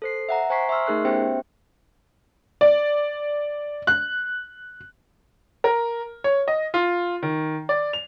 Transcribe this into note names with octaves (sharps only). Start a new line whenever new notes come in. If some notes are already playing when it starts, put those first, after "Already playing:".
A4 C5 C7
E5 F#5 A#5
C5 G#5 A#5 C#6 B6 C7
E5 C6 C#6 E6 F6
A3 D#4 G#4 A#4 F#6 C7
B3 C#4 G4 C5 E5 G5
D5
F#6
A#4
C#5
D#5
F4
D#3
D5
F7